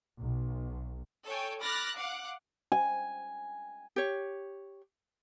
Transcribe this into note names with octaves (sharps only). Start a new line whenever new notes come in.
B1
A4 C#5 G5 G#5
B5 D6 F6 F#6 A6 A#6
F5 F#5 D6
G#5
G4 C#5